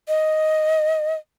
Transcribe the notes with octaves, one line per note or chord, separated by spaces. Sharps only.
D#5